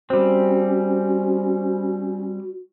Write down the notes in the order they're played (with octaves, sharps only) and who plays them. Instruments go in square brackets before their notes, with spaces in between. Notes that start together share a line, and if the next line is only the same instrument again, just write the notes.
[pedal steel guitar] G3 C4 [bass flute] C#4 [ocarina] F#4 [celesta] C5